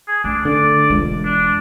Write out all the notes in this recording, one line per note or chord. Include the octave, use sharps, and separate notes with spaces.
G#4
A3 D4
D3 D5
E1 G#3 F4
D4